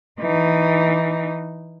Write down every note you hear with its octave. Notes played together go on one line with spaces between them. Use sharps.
E3 D#4